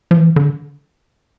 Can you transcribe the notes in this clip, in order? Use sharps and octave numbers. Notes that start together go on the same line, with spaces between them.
F3
E3
D3